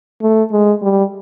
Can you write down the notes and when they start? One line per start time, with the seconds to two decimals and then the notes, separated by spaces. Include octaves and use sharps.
0.22 A3
0.52 G#3
0.82 G3